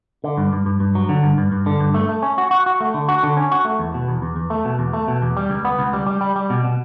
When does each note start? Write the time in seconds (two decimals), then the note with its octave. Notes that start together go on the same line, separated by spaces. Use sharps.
0.24 D3
0.38 G2
0.53 G2
0.66 G2
0.80 G2
0.95 F#3
1.09 D3
1.23 G2
1.38 G2
1.52 G2
1.66 D3
1.80 G2
1.94 A3
2.09 A3
2.22 C#4
2.38 F#4
2.51 F#4
2.66 F#4
2.80 A3
2.94 D3
3.08 F#4
3.23 D3
3.37 C#4
3.52 F#4
3.65 A3
3.79 E2
3.94 B2
4.08 E2
4.22 E2
4.36 E2
4.50 A3
4.65 B2
4.79 E2
4.93 A3
5.08 B2
5.22 E2
5.37 G3
5.50 C#2
5.65 B3
5.79 C#2
5.93 G3
6.07 G3
6.21 G3
6.36 G3
6.50 B2
6.65 B2